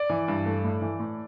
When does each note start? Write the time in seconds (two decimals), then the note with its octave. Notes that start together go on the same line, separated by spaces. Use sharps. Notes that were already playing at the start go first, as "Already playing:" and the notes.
Already playing: D5
0.10 E3
0.28 G2
0.46 A3
0.64 A2
0.81 E3
0.99 A2